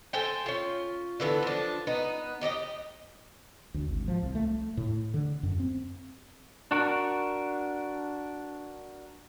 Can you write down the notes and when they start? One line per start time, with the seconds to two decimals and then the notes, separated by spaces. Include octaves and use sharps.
0.13 A4 C5 G5 G#5
0.46 C#4 F4
1.20 D3 E3 B3 A4
1.43 F3 D4
1.87 B3 D#4 B4
2.41 D#4 G4 D5 D#5
3.74 D2
3.89 G#1
4.08 F3
4.23 C2
4.35 A3
4.77 A2
5.14 D3
5.43 F#2
5.60 C4
6.71 D4 F#4 A#4